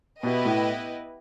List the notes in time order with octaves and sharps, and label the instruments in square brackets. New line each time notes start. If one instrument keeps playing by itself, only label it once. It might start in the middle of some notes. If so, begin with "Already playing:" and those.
[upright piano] B2 [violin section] B3 E4 G4 B4 D#5
[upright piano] A2